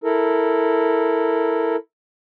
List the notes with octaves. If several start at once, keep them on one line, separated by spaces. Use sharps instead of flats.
E4 A4 A#4